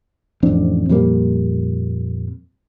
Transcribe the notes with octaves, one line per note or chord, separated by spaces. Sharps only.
A1 F2 C4 D4
F2 A#2 G3 A#3